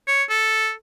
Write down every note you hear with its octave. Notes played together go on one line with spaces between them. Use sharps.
C#5
A4